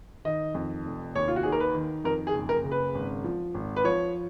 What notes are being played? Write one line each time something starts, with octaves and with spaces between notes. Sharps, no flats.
D#3 D#5
F2
F1
D#2 C#5
F4
F#4
D#3 G#4
A#4
B4
D#3
F2 A#4
G#4
F#1
A#4
C#3
B4
G#1
F3
G#1
B4
F3 C#5